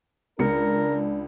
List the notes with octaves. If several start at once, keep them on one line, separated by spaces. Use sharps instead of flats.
C#2 D4 A#4 C#7